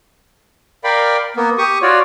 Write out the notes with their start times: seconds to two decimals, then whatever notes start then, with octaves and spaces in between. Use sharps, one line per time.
0.84 A#4 D5 F5 G5 B5
1.36 A#3 B3
1.58 G4 C#6 D#6
1.82 F4 F#4 C#5 D5